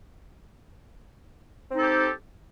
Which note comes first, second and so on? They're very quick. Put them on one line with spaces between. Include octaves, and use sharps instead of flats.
C4 D#4 A4 G4